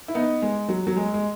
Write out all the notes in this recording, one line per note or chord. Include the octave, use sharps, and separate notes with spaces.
E4
B3 D#4
G#3
F#3
F#3
G#3
G#3